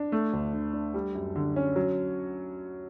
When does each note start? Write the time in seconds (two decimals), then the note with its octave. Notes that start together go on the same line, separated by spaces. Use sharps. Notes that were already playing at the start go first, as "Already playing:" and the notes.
Already playing: D4
0.12 A3
0.33 D2
0.53 D3
0.73 D4
0.94 G3
1.15 F#2
1.36 D3
1.56 C#4
1.76 F#3